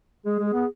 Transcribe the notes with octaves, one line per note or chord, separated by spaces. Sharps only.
G#3 G#4
G#3
G#4
B3